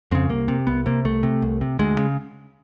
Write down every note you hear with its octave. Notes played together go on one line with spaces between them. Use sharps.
F2 C#3 C4
C2 A#3
C3
C2 B3
C3 A#3
C2 A3
C3
C2
C3
D2 G#3
C#3